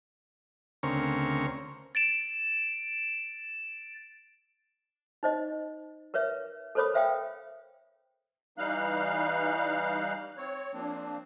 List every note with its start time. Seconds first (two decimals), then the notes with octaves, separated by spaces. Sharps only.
0.83 D2 C#3 C4 A#4 C#6
1.95 A6 D7 E7
5.23 D#4 C5 D#5
6.14 A#4 B4 C#5 E5
6.75 A4 A#4 C5 C#5 B5 D#6
6.94 B4 C5 E5 F5 G5 D#6
8.58 E3 G3 D#4 F5 F6 F#6
10.37 C4 C#5
10.73 F3 A#3 C4 D4